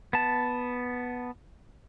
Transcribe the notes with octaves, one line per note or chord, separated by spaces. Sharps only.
B3 A5